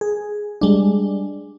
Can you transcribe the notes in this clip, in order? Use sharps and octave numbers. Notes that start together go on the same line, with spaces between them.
G#4
G3 G#3 D4